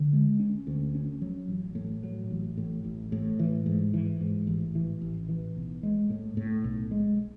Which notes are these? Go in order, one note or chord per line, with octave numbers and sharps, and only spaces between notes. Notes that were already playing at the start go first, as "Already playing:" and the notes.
Already playing: D3
G#3
C#4
D2
C#4
F#3
A1
A2
F#3
A1
A2
A1
A2
E3
G#2
E3
G#2
A1
E3
A1
E3
B1
G#3
A2
A2
B1
G#3